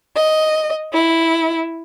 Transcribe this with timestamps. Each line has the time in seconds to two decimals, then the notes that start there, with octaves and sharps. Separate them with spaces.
0.15 D#5
0.92 E4